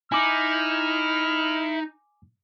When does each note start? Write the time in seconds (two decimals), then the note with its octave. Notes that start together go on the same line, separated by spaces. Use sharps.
0.12 D#4 E4 G#5 D6 F6